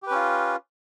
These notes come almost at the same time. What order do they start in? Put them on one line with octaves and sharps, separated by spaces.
G4 B4 C#4 F4